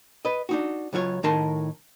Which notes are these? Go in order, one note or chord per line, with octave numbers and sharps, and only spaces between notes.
B4 D#5
D4 D#4 F#4
C#2 F#3 F4 C#5
A2 D#3 D#4 A#4 A5 C6